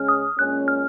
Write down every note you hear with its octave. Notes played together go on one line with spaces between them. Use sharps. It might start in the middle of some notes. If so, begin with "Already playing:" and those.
Already playing: C#3 G#3 C#4 F6
D#6
A#2 G#3 C#4 F#6
F6